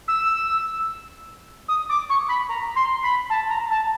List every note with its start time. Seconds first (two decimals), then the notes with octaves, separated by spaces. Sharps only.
0.07 E6
1.68 D#6
1.89 D6
2.09 C#6
2.28 B5
2.49 A#5
2.75 C6
3.03 B5
3.29 A5
3.49 A#5
3.70 A5